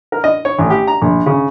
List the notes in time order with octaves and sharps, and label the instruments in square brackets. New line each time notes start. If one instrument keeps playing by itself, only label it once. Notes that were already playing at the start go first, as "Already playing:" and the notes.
[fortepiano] A#4
D#5
C#5
A1
G4
A#5
A#1
C#3